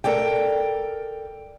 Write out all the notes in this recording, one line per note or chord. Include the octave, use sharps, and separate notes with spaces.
A4 A#4 D5 G5